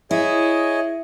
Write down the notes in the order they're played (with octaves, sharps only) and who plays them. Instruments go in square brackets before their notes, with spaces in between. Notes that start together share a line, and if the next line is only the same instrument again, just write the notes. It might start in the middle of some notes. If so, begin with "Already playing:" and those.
[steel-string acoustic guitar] E4 [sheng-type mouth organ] G#4 C#5 D#5